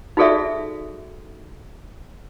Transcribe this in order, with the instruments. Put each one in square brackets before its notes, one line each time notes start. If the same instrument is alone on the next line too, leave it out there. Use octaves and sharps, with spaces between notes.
[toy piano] D#4 F#4 G#4 A4 D5 E5